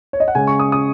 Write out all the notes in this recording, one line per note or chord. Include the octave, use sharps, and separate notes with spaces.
C#5
D#5
F#5
C#3 G#3 C#4 G#5
C#6
D#6
D#6